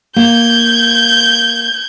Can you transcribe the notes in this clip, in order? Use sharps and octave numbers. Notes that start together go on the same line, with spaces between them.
A#3 G6 G#6